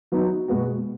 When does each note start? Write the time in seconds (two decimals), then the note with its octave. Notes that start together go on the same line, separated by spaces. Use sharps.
0.12 F#3 B3 D#4 F#4
0.48 B2 G#3 B3 F#4